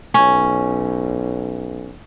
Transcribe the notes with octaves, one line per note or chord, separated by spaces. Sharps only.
B1 C#4